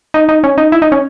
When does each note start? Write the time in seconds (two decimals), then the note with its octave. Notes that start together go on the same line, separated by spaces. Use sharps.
0.14 D#4
0.29 D#4
0.44 C#4
0.58 D#4
0.72 E4
0.82 D#4
0.92 C#4